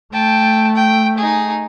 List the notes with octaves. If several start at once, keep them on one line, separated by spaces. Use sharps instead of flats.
A3 G5 A5
G5
D#4 G#4